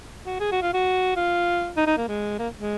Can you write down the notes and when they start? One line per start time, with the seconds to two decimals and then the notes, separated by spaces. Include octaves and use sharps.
0.25 F#4
0.40 G#4
0.52 F#4
0.62 F4
0.73 F#4
1.16 F4
1.77 D#4
1.87 D#4
1.97 A#3
2.08 G#3
2.39 A#3
2.59 G#3